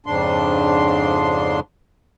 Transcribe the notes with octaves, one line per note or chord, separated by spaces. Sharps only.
F2 G#2 C#3 D4 C6